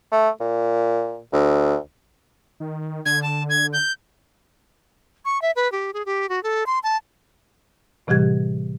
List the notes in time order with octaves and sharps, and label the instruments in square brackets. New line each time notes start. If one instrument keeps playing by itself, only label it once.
[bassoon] A3
A#2
D2
[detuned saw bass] D#3
[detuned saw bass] D3 [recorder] G#6
[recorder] A5
G#6
G6
[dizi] C#6
E5
B4
G4
G#4
G4
F#4
A4
C6
A5
[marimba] A2 C3 E3 G3 G4 G#6